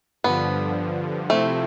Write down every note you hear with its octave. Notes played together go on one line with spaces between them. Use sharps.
G2 D3 F3 B3
C3 F3 A3 C4 E4